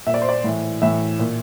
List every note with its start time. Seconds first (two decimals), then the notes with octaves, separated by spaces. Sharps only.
0.06 A#2 E5
0.14 D5
0.22 C5
0.29 D5
0.44 A2 E3
0.82 A2 E3 E5
1.19 A#2